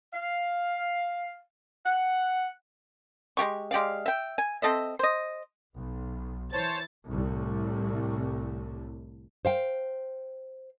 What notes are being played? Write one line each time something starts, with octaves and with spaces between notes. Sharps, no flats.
F5
F#5
G#3 A3 G4 C#6
G#3 G4 D5 F5
E5 G5
G#5
C4 A4 D#5 E5
C5 D#5
B1
E3 C5 C#5 A5 A6
C2 A2
C5 F5 G5